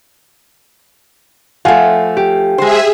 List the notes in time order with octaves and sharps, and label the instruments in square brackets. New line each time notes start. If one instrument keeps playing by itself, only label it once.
[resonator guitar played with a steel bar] F3 A3 [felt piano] F5 F#5 G#5
[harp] G4
[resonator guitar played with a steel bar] G#3 C5 [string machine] G#4 E5